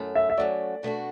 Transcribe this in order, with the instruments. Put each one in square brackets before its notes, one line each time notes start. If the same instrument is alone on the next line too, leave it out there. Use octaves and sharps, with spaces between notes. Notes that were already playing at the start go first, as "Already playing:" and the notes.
Already playing: [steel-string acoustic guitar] F#2 F#3 A3
[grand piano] E5
E5
[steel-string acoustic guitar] F#2 F#3 A3 [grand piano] D5
[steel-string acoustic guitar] B2 A3 D4 F#4